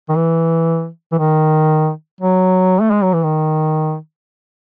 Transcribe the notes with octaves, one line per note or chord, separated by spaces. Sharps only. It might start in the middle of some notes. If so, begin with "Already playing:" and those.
D#3
E3
E3
D#3
F#3
A3
G#3
F#3
E3
D#3